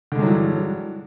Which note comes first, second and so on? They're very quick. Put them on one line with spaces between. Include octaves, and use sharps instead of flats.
D3 G#3 G2 F#3 E3